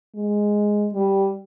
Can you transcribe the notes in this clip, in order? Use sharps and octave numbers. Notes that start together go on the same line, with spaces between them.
G#3
G3